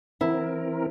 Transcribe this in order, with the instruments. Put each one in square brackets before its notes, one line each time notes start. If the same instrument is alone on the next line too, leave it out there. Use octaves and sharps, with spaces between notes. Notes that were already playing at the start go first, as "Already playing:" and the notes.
[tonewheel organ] E3 C4 A#4 [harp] E4